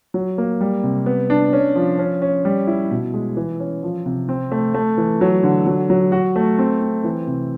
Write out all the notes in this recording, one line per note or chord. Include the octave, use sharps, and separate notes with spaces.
F#3
A#3
G3
C3
B3
D4
C#4
F3
C#4
C#4
G3
E4
B2
G#3
E3
C#4
F3
C3
C4
A3
A3
E3
F#3
D3
F#3
F#3
F#4
A3
C4
C4
E3
C3